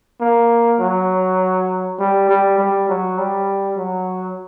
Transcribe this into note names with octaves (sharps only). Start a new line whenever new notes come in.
A#3
F#3
G3
G3
G3
F#3
G3
F#3